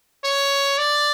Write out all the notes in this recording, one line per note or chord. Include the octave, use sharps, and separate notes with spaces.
C#5
D5